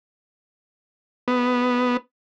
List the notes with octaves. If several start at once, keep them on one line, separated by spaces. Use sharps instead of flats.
B3